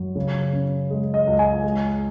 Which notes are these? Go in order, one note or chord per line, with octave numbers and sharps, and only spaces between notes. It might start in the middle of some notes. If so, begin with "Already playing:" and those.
Already playing: F#2 F#3
C#3
C#4
G#3
D#5
C#2
G#5
G#3